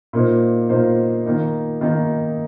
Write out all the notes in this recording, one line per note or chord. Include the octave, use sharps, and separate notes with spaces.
A#2 A#3 D#4 C5
A#2 A#3 D#4 C5
D#3 A#3 D#4
D#3 A#3 D#4